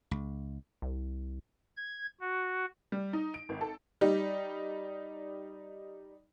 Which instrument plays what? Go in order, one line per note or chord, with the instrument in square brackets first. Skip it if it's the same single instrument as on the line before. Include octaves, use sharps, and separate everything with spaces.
[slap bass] C#2
[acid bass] C2
[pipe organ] G#6
F#4
[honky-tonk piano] G3
D#4
D7
G#1
A4
G3 D#4 G4